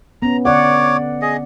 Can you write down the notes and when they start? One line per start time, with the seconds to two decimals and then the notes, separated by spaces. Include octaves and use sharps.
0.22 B3 C#4 A#5
0.45 D3 C#5 D5 F#5 D6
1.22 G#4 D#5